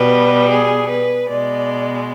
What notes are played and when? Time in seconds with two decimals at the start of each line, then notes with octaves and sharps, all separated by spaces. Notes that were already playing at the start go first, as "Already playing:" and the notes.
Already playing: B2 G3 B4
0.50 G#4
0.89 B4
1.28 B2 G#3 D5